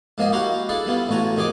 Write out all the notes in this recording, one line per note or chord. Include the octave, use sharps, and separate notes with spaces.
G#2 F3 A#3 G#4 D#5
E4 F#4 G4 F5 F#5 A#5
D4 E4 G#4 A4
G3 B3 E4 F4
A1 A2 F#4 G#5 A#5
F2 D#3 D#4 G#4 G#5 D6